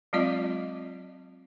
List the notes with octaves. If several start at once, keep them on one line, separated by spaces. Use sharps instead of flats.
F#3 G#3 C4 F4 D5 D#5